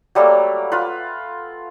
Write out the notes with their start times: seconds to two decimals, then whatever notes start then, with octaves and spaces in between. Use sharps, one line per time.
0.15 F#3 G3 A3 A#3
0.72 F4 B4